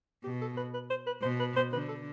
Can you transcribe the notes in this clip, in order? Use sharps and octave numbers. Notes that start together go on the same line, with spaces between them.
B2 G4
A4
B4
B4
C5
B4
B2 C5
B4
C5
D3 B4
A4